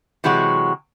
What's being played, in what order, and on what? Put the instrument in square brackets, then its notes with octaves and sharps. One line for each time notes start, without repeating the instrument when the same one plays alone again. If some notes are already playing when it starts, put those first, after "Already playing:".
[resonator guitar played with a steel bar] C3 E3 F#3 G#3 F#4